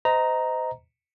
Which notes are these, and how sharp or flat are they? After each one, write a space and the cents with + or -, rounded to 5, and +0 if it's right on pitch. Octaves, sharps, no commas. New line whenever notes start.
C5 -35 D#5 +15 A#5 +0